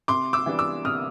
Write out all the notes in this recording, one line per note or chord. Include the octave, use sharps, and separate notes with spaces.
C3 C6 D6
D6 E6
E3 G3 B3 D4
D6 E6
C3 D#6 F6